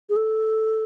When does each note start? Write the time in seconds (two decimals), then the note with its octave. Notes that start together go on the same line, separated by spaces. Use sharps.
0.09 G#4
0.16 A4